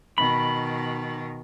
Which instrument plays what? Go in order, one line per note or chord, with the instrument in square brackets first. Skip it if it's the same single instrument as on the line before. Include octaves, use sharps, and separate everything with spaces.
[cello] B2 D#3 [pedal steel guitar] B5